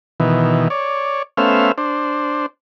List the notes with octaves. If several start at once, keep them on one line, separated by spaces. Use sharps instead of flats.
B2 D#3 E3
C#5 D5
A3 B3 C#4 C5 E5 F5
D4 C5